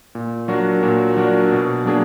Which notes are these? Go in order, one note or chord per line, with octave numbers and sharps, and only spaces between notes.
A#2
F#3 D4 F#4 A#4
A#2
F#3 D4 F#4 A#4
B2
F#3 A#3 D4 G#4